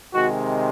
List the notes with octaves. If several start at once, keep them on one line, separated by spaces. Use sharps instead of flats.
C3 D#3 G#3 F#4